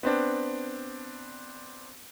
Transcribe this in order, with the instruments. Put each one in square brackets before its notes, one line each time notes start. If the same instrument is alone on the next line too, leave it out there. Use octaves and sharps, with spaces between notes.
[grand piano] B3 C4 D4